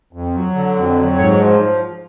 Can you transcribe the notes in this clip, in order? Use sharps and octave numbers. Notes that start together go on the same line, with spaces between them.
F2
F#3
D3
F2
F#3
G#2 C#5
F3